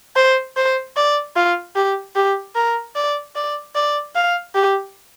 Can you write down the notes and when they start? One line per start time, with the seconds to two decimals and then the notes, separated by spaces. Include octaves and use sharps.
0.16 C5
0.57 C5
0.96 D5
1.36 F4
1.76 G4
2.16 G4
2.55 A#4
2.96 D5
3.36 D5
3.75 D5
4.16 F5
4.55 G4